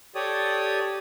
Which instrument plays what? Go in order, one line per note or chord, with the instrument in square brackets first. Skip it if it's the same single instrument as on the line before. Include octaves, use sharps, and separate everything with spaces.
[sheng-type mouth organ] G4 A4 C#5 D5 D#6